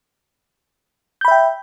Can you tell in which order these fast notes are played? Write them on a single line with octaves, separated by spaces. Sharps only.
G6 B5 E5 G5